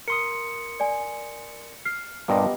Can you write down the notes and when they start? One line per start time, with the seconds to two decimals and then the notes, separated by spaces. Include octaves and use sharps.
0.08 A#4 C6 D#6 C#7
0.80 D5 G#5
1.85 F6 C7
2.28 G2 A#2 B3 G4 D#5